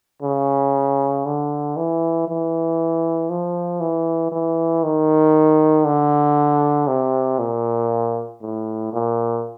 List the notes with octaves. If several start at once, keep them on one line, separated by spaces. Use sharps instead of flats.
C#3
D3
E3
E3
F3
E3
E3
D#3
D3
C3
A#2
A2
A#2